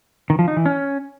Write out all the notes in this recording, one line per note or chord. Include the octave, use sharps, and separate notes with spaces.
D#3
F3
D#4
E3
C#4